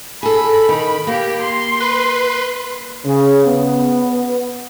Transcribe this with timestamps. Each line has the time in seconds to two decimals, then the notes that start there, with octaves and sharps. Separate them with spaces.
0.23 G#4 A4 B5
0.69 D#3
1.07 A#3 G4
1.42 C6
1.80 B4
3.06 C#3
3.46 B3